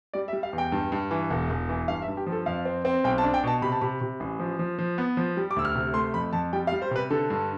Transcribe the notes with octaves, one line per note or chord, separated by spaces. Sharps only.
G3 D5
E5
G3
F5
E2
G5
G2
G2
E3
E1
E1
E3
G2 F5
E5
G2
G4
F3
A4
F2 F5
C4
C4
B1 G5
A5
D4
G5
B2 A5
C3 B5
A5
C3 B5
C3
A1
F3
F3
F3
B3
F3
G3
D6
D2 E6
F6
C3
A3 C6
F2 B5
F2 A5
G3 G5
F5
G3
C5
C3 B4
D3 A4
G2